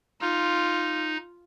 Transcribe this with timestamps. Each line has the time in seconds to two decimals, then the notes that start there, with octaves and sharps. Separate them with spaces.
0.21 D#4 F4